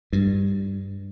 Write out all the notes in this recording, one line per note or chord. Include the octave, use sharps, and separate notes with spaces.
G2